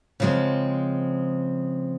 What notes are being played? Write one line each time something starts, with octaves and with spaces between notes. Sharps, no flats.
C#3 F3 G#3 C4